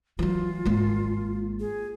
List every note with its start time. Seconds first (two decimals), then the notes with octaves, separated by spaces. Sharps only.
0.19 E3 F#3 F4
0.65 G#1 A#3
1.60 G#4